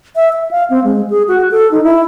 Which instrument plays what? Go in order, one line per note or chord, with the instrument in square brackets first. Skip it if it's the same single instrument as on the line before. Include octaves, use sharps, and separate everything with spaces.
[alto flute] E5
E5
F5
C4
G#3
G#4
F#4
A4
D#4
E4